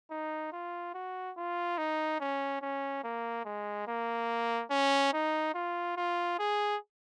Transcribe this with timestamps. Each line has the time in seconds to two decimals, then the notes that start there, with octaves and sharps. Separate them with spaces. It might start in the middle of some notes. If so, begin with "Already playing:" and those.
0.11 D#4
0.52 F4
0.94 F#4
1.37 F4
1.78 D#4
2.20 C#4
2.61 C#4
3.03 A#3
3.45 G#3
3.88 A#3
4.71 C#4
5.13 D#4
5.54 F4
5.97 F4
6.39 G#4